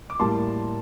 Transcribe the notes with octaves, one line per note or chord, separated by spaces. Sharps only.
D6
A2 G3 A#3 A5 C6